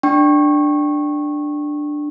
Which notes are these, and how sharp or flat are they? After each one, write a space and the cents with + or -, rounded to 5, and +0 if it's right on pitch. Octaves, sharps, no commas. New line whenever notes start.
D4 +10 G5 -5 C#6 -20